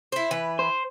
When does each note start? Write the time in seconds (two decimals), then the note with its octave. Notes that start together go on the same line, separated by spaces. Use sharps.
0.12 E4 C5
0.31 E3 B4
0.59 C5